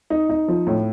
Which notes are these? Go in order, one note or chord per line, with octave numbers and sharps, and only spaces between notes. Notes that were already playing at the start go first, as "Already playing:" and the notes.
D#4
D#4
F3
A2